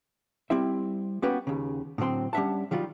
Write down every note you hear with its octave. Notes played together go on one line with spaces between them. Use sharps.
G3 C4 E4 E5
A#3 B3 C#4 F#4 G4 B4
D#2 C#3
A2 D3 F#3 C4 C6
G3 C#4 D4 E5 F#5 A5
D#3 F#3 G3 F4